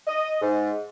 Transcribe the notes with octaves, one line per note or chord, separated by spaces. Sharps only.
D#5
G#2